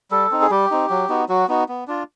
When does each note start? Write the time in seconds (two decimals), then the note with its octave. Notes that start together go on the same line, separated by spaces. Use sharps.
0.11 G3 A4
0.31 C4 D#4
0.41 G#4
0.50 G3 G4
0.71 C4 D#4
0.90 F#3
1.09 B3 D#4 F#4
1.29 F#3 F#4
1.48 B3 D#4 F#4
1.69 B3
1.87 D4 F4